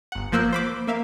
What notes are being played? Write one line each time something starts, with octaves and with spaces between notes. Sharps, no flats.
G1 F#5
F3 A#3 C5 E6 F#6
C5 B5 D6
A#3 E5 F5